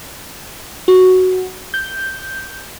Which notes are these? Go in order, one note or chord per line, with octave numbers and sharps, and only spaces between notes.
F#4
G6